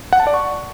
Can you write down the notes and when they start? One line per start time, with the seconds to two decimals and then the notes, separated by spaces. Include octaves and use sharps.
0.13 F#5
0.20 A5
0.27 D5
0.34 C#6